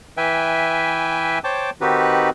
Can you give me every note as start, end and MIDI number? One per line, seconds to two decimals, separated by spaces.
0.17 1.39 52
0.17 1.39 71
0.17 1.39 76
0.17 1.39 79
0.17 1.39 80
1.44 1.70 72
1.44 1.70 73
1.44 1.70 79
1.44 1.70 81
1.44 1.70 86
1.81 2.30 51
1.81 2.30 60
1.81 2.30 63
1.81 2.30 66
1.81 2.30 67
1.81 2.30 71